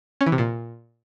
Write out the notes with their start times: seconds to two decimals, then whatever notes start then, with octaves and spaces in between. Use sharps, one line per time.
0.21 C#4
0.26 E3
0.32 C3
0.38 A#2